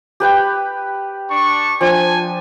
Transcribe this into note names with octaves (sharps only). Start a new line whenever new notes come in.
G4 B4 G5
D4 C#6
F3 D4 G#5